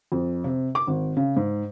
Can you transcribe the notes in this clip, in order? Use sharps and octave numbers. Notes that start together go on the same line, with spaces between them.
F2
C3
D6
G#1
C#3
G#2